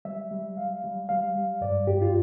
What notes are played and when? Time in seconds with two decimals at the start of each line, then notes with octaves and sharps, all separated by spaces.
0.05 G3 E5
0.31 G3
0.57 G3 F5
0.84 G3
1.09 G3 F5
1.35 G3
1.61 G2 D5
1.87 G2 G4
2.02 F4